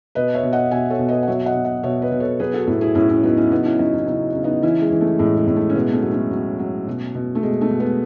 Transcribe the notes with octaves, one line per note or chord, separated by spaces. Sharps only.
B2 B4 D#5
C#5 E5
B2
D#5 F#5
B2 E5 G#5
A4 C#5
B2
B4 D#5
F#5
F#3 C#5 E5
D#5 F#5
B2
D#5 F#5
B2 C#5 E5
B4 D#5
B2
A4 C#5
F#3 G#4 B4
F#4 A4
A2 E4 G#4
E4 G#4
A2 C#4 E4
C#4 E4
F#3 B3 D#4
C#4 E4
C#3 B3 D#4
C#4 E4
F#3 D#4 F#4
C#4 E4
C#3 C#4 E4
C#3
B3 D#4
E3 C#4 E4
G#3
E3
A3
A2 G#3
G#3
A2
A3
C#4
B2 G#3 B3
A3 C#4
F#3
A3 C#4
F#3
F#3
B2
B2
A3
B2 G#3
A3
B2
G#3 B3